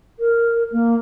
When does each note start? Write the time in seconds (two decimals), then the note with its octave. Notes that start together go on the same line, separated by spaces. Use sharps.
0.19 A#4
0.72 A#3